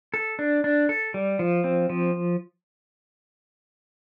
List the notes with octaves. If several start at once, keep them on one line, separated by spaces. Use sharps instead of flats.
A4
D4
D4
A4
G3
F3
C4
F3